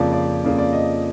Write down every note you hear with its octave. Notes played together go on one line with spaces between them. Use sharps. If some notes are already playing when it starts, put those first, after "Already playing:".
Already playing: F2 C#3 F3 A#3 D5
D5
F2 C#3 F3 A#3 D5
D5
D#5